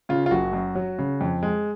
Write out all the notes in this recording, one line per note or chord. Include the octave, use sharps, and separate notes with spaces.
C#3 F4
F4
F#1 F#4
F#2
F#3
C#3
F2
G#3